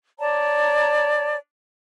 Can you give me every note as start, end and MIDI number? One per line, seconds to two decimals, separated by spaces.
0.19 1.36 73
0.19 1.36 74
0.19 1.36 81
0.19 1.36 82